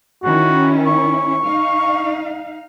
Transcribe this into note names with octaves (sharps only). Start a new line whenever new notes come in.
D#3 C#4 E4 F#4
C#6
D#4 F5